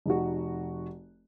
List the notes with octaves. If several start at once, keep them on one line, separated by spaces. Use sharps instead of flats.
F1 D#4 F#4